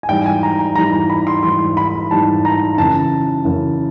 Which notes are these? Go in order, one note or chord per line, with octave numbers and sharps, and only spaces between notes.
G#5
G#2 E3 G3 G5
G#5
A#5
A#5
G#2 E3 G3 A#5
A#5
B5
C6
G#2 E3 G3 C6
B5
G#2 E3 G3 A5
A#5
F#2 C#3 E3 A5
F#2 C#3 E3